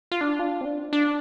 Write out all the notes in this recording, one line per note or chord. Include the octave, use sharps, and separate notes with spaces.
F4
D4
F4
C4
D4
D4